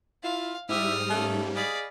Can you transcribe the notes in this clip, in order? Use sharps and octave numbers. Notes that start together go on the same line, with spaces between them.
E4 F4 F5
G#2 G3 E4 G4 E5 D#6 F6
A3 A#3 C#4
G#4 D5 D#5 F5 B5